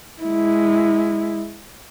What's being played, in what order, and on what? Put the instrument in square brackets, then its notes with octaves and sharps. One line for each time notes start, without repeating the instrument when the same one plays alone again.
[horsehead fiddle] G#3 E4